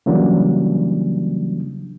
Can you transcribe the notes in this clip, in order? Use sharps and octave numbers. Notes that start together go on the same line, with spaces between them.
C#3 E3 F#3 G3 A#3 D4